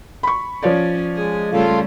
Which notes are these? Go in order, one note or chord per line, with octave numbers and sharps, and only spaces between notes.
B5 C#6
F3 C#4 C#5 D5
G#3 G#4
C#3 G3 A3 F4 A4 F5